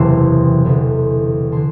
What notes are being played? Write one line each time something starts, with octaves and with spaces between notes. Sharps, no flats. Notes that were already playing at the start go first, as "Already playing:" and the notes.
Already playing: F#1 E2 C3 E3 A5 C6 D6
E1 E2 D3
D3 A5 C6